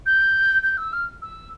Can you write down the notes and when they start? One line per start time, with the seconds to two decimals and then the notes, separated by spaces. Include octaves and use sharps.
0.06 G6
0.63 G6
0.78 E6
0.93 F6
1.22 E6